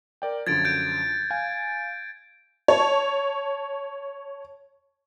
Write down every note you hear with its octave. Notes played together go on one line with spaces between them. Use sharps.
A#4 D5 G5
F#2 D3 F3 G#6 A6 D7
G6 D7
F5 G#5
C#5 A5